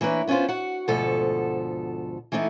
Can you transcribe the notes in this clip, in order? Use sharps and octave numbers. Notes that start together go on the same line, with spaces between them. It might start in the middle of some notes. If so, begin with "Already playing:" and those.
E3 A#3 D4 B4 C#5
B3 C#4 D#4 F4 C5
F#4 F#5
D2 G#2 B2 F3 A4 F#5
E3 A3 B3 D4 D#4